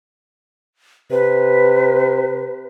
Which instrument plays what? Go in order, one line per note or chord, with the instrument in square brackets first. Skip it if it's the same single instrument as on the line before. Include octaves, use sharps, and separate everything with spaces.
[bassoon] C3 [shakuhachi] B4